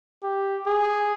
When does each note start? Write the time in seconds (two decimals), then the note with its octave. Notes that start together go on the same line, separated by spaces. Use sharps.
0.23 G4
0.66 G#4